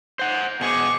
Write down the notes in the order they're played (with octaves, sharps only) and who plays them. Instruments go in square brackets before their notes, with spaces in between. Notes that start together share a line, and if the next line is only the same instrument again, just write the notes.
[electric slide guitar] C5 F#5
[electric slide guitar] B2 G#4 [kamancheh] C#6 D6